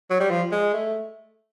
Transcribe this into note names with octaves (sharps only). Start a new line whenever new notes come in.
F#3
G3
F3
G#3
A3